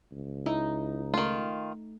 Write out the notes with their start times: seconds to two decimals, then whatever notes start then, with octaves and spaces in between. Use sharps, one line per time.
0.12 C#2
0.46 D#4 E4
1.14 D#3 A3 F4